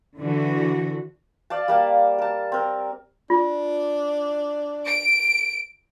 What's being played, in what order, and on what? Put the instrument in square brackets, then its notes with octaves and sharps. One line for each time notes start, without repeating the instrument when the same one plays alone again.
[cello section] D3 E3 F#4
[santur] D5 F5 A5
G3 A#3 A5
A#4 A5
C4 A#4
[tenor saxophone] D4 [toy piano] F4
[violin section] D7